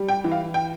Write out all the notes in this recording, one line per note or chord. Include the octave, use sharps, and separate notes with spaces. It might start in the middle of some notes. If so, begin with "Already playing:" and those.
Already playing: G3
G5
E3
F5
G5